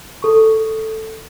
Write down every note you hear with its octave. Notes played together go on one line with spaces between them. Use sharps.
A4 C#6